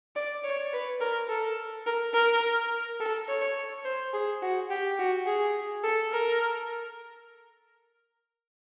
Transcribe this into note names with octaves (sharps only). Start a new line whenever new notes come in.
D5
C#5
B4
A#4
A4
A#4
A#4
A4
C#5
C5
G#4
F#4
G4
F#4
G#4
A4
A#4